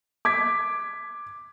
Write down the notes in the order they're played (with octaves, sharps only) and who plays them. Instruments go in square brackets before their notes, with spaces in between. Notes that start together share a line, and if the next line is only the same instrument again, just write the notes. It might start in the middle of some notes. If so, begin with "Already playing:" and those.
[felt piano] D6 G#6 B6